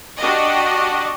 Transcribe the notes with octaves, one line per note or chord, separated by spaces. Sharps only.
D4 F#4 G4 D#5